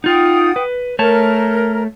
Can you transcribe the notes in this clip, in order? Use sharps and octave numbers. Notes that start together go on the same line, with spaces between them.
D#4 F4 F#5 G5 D#6
B4
A3 A#4 C#5 A5